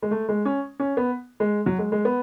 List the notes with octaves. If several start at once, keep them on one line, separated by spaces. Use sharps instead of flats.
G#3
A3
G#3
C#4
C#4
B3
G#3
F#3
G#3
G#3
B3